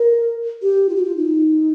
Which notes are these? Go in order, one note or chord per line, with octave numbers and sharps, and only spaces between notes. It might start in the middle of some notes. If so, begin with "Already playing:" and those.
Already playing: A#4
G4
F4
F#4
F4
D#4